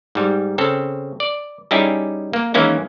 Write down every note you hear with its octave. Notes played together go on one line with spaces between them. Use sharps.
G#2 G3
C#3 C4 A4
D5
G3 C#4 D#4 E4 G4 G#4
A#3
D#3 E3 G#3 A#3 C#4 E4